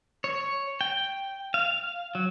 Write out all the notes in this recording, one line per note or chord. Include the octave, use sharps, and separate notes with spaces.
C#5
G5
F5
F#3